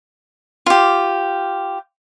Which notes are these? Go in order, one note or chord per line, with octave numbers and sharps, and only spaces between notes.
F4 G4